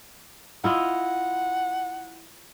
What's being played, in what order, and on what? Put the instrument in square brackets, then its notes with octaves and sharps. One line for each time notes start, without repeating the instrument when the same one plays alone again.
[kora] E4 F4 D#5 [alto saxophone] F#5